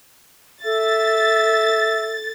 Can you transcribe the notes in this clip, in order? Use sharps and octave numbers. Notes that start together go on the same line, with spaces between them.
A4 E5 A6